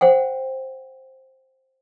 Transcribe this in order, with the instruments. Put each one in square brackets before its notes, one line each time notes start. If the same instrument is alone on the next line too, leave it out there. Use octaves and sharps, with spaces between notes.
[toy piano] C5 F#5 G5